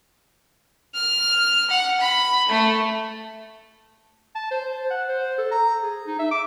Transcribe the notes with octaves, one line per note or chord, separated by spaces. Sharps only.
F6
F#5
B5
A3
A5
C5
C5
F#5
C5
A4
A#5
G#4
D#4
E5
D6